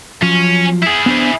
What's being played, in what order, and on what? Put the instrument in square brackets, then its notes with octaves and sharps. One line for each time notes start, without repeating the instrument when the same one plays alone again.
[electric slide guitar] F3 F#3 [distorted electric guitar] C#4
[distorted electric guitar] E4 G#4
[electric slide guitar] B3 D4 C5